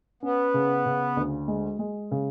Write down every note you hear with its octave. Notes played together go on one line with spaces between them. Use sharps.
B3 C#4
C#3
C#3
D2
G#3
G#3
C#3